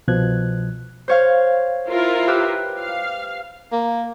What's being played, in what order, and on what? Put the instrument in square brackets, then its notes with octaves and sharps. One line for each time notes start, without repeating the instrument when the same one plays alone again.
[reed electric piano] C2 B2 F3 F#6 G#6
[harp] C5 C#5 F5
[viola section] E4 F4 A#4
[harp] G4 B4 E6
[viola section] F5
[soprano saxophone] A#3